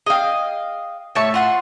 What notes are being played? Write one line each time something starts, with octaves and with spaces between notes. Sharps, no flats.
G#4 D#5 F5 G5
A2 A3 C#5 E5 A5 C#6
F4 F#5 C6